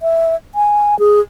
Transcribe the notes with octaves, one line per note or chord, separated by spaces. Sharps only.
E5
G#5
G#4